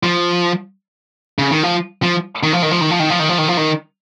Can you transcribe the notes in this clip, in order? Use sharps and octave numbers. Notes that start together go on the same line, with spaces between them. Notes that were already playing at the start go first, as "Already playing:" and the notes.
F3
C#3
D#3
F3
F3
D#3
F3
D#3
F3
D#3
F3
D#3
F3
D#3
F3
D#3
F3
D#3